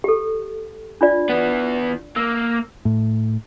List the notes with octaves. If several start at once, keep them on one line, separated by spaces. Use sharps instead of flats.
G4 A4
D4 F4 D5
E3 B3
A#3 E6
A2